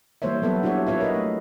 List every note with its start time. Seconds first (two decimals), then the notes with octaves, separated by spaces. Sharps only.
0.22 E3 G3 A#3 C5 C#5 E5
0.42 F#3 B3 A4 B4 E5
0.63 D4 E4 F#4 G4 C#5 E5
0.87 E4 F4 B4 C#5 E5 F5
1.01 A#4 B4 D#5
1.14 A3